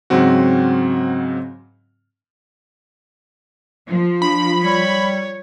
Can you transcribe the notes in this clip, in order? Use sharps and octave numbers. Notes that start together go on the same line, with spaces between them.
G#2 C#3 F#3 C4 F#4
F3
D4 B5
G3 C#5